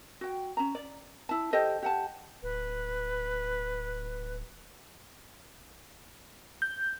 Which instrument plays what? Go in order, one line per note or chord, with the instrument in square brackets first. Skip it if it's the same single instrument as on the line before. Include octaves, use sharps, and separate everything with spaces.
[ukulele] F#4 G5
C#4 A#5
D5
E4 A5
G4 A4 C5 D#5
G4 F#5 A5
[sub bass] D1 [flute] B4
[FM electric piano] G6